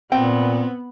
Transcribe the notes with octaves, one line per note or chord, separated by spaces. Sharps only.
A#2 B3 C4 G5